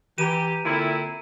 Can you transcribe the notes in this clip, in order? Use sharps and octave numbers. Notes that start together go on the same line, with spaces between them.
E3 G4 A#5 D#7
A#2 D3 C4 E4